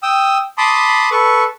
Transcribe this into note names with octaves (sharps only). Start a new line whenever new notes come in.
G5 D#6 E6
A5 B5 C6 D6 D#6
A4 B4 C#6